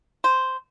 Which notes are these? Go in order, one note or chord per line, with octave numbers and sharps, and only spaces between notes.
C5